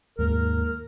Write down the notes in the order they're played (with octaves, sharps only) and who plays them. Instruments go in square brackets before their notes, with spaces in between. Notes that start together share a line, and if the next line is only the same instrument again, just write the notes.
[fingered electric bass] D#2 G#2 A#3 [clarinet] A#4